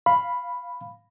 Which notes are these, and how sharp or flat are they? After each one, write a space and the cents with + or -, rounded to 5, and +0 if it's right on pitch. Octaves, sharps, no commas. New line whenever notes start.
F5 +0 B5 +0